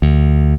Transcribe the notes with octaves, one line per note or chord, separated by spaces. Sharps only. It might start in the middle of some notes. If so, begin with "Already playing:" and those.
D2